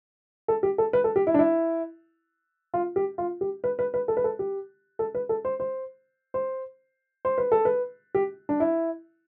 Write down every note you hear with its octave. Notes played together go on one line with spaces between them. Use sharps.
A4
G4
A4
B4
A4
G4
E4
D4
E4
F4
G4
F4
G4
B4
B4
B4
A4
B4
A4
G4
A4
B4
A4
C5
C5
C5
C5
B4
A4
B4
G4
D4
E4